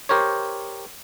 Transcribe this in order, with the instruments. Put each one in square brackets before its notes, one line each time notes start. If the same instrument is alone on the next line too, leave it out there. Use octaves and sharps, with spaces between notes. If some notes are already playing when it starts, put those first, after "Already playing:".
[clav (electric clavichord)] G4 A#4 C5 C#5